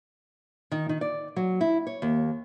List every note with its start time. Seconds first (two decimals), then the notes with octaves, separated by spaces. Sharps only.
0.72 D#3
0.89 D#3
1.01 D5
1.36 F#3
1.61 E4
1.87 C#5
2.02 D#2